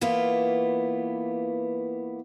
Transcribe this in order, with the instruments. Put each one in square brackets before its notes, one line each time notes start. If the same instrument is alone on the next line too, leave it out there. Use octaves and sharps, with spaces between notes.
[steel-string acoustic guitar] E3 A#3 B3 F4